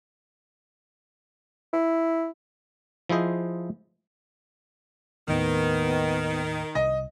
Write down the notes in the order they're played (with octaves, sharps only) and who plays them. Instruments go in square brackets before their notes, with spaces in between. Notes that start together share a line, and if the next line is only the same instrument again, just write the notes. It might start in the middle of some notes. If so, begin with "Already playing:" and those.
[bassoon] E4
[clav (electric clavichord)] F3 E4 G#4 C5 D#5
[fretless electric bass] D#2 A2 [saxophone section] D#3 [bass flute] B3
[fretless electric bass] C2 [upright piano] D#5